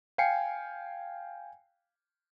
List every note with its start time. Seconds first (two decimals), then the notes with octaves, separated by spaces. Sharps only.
0.18 F5 G5 G#5 C7 C#7